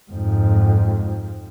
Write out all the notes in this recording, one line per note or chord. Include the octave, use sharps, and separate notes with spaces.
F2 G#2